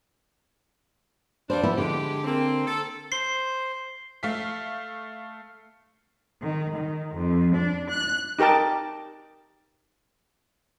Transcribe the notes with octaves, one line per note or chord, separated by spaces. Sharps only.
F2 G3 D4 C5
F3 B3 E4
D3 G#3 G4
A#3 C4
A4
C5 C7 G7
A3 F5 B6
D#3
D#3
F2
D4
F#6
D#4 G4 A#4 G5 A5